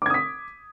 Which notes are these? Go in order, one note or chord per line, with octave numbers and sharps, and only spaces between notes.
D6 D#6 G#6 B6